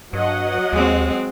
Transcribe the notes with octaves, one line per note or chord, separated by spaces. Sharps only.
G2 F#3 D#5 F#5
D#2 G#3 C4